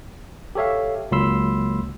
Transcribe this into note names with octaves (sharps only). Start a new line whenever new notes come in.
G4 A4 C#5 E5 F5
C#2 F#3 A#3 B5 C6 E6